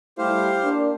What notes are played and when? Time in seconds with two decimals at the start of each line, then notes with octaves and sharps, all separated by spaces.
0.18 G3 A3 E4 G4 C5 F5
0.63 A#3 D4